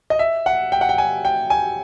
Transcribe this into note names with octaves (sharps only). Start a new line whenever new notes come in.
D#5
E5
F#5
G5
F#5
G5
G#5
G5
G#5